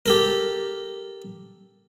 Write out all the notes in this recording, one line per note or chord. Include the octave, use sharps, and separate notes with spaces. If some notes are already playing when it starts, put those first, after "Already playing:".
G4 A4 A#4